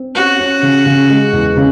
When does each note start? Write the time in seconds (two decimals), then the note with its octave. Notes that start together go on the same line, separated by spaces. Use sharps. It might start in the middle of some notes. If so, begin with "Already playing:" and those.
Already playing: C4
0.15 C#4 F#4
0.39 C#4
0.63 C#3
0.86 C#3
1.10 G#3
1.33 E2
1.57 C#3